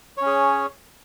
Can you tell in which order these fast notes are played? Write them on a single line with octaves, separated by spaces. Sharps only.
C#5 C#4 G#4